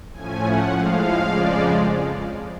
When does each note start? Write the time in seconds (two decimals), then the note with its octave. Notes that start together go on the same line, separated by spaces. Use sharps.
0.13 A2 F3 A3 C#4 G#5
0.42 F#5
0.70 A2 F3 G#3 F5
1.28 F2 C#3 F3 G#3 D5